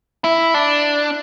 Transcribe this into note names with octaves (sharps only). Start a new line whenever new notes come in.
E4
D4